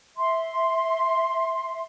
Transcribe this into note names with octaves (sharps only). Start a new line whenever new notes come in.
E5 C6